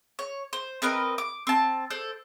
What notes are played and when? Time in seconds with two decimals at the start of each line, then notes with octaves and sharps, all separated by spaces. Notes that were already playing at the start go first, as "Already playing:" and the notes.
0.19 C#5
0.53 C5
0.82 C4 A#4 B4 D#5
1.18 D6
1.47 C4 A5
1.90 A4 C5 D5